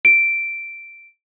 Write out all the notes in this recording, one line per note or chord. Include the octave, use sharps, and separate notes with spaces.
D7